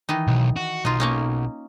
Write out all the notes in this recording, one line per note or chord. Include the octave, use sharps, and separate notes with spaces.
D#3 E3 D#4
B1
F#4
B1 D#4 F4
A#3 C#4 D#4